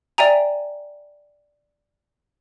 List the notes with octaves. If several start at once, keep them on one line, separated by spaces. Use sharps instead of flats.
D5 E5 G5 G#5 A#5